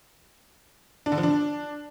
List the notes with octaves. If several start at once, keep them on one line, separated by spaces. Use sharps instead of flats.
D4
D3
F3
D4